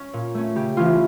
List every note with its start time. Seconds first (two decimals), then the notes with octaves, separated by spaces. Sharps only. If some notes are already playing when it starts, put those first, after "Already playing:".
Already playing: C#4
0.13 A#2
0.35 A3 C#4
0.56 C#3 G4
0.77 E3 A3 C#4 F4